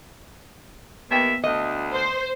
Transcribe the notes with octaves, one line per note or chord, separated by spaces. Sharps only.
D#2 A#3 B3 B4 E5 G5
D2 D#5
C5